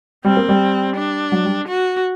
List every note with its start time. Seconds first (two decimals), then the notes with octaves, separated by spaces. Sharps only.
0.25 G3 C4
0.37 A#3
0.49 G3
0.96 D4
1.32 F#3
1.45 G3
1.68 F#4